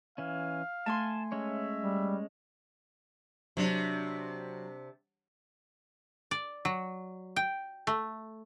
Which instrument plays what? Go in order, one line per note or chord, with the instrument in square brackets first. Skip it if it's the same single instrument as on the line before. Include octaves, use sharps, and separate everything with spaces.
[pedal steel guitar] E3 C#4 [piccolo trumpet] F5
[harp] A3 G#5 C6 [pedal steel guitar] A5
[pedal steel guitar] G#3 C#4 C#5 [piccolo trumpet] E5
[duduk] G3
[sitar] C3 D4 [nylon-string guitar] F#3
[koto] D5
F#3
G5
A3